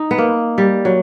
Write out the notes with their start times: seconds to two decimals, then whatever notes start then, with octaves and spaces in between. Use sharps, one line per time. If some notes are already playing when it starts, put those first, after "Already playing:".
Already playing: D#4
0.11 B3
0.18 A#3
0.58 G3
0.85 F#3